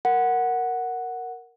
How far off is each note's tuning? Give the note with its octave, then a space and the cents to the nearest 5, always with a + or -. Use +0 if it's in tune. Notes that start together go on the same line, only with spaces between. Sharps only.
A#4 +0 F#5 +0